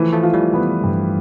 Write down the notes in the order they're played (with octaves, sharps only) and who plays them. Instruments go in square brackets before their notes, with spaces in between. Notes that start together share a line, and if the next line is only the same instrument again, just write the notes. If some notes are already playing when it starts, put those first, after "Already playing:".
Already playing: [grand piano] E3 [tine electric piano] F3 A3
[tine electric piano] F3 A3
[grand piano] F4
[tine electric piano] E3 G3
[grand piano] B3
G2